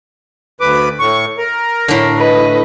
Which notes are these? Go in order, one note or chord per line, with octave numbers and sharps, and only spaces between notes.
D2 B4 D6
A2 C#6
A#4
A2 D3
B4 D#5